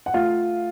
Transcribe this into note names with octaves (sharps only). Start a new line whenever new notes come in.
F#5
A3 F4 F5